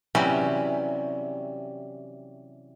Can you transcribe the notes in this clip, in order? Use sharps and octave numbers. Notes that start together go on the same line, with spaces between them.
C3 E3 F#3 G3 C#4